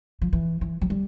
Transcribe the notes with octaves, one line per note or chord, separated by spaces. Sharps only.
F3
E3
E3
F#3
G3